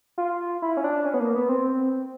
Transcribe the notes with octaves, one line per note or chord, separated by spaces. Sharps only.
F4
E4
C#4
D4
C#4
B3
A#3
B3
C4